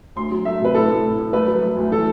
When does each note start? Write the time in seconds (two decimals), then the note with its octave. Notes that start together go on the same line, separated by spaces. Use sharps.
0.16 D2 C6
0.31 F#3
0.45 A3 E5
0.61 C3 B4
0.74 A2 A4
0.90 A2
1.04 A2
1.18 A2
1.33 A3 B4
1.47 F#3
1.63 A3
1.77 D2
1.91 E3 A4